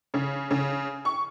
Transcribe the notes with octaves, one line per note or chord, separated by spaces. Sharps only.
C#3
C#3
C#6